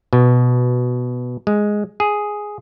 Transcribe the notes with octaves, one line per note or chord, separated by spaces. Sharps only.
B2
G#3
G#4